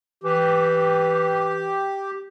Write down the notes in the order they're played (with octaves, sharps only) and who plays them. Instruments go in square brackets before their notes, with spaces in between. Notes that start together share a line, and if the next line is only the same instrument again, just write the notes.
[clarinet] E3 [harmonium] G4